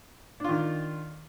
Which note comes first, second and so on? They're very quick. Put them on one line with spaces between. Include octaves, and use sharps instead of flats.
D4 F4 D#3